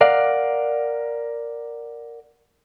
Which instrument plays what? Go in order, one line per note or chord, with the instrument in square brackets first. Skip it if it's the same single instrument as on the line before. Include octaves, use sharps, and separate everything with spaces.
[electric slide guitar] A#4 D5 F5 F#5